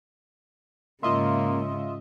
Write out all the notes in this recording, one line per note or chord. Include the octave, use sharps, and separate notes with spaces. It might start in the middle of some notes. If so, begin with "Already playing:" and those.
G#2 C#3 A#3 F4 D#5 E5 C6